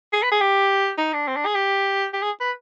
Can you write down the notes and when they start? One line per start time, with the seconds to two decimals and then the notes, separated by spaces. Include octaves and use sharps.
0.13 G#4
0.23 B4
0.32 G#4
0.41 G4
0.98 D#4
1.13 D4
1.28 C4
1.36 D4
1.46 G#4
1.55 G4
2.14 G4
2.22 G#4
2.41 B4